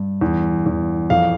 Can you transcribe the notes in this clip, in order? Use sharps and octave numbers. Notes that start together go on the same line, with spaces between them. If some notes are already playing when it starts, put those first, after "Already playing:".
Already playing: G2
E2
E2
F2 F5